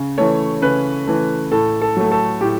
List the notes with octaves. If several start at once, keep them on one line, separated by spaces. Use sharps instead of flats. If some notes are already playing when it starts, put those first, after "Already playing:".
Already playing: C#3
E3 A3 C#5
C#3 B4
E3 A3
A2 A4
A4
F#3 A3
A4
A2 G4